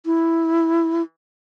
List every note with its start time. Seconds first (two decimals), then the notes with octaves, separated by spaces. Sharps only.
0.06 E4